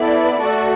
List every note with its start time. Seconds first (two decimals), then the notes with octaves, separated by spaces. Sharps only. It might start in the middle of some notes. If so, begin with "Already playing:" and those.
Already playing: B3 E4 A4 D5
0.41 A3 F#4 A4